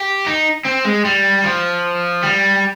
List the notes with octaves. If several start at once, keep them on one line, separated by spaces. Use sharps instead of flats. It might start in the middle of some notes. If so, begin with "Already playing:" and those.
Already playing: G4
D#4
C4
G#3
G3
F3
G3